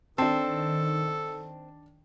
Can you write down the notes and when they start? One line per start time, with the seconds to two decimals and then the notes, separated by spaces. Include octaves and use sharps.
0.18 D#3 C4 D4 A4 A5